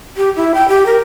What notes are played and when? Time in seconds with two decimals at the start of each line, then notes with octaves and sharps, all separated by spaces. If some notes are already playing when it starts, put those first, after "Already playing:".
0.17 G4
0.36 E4
0.54 G5
0.68 G4
0.86 A#4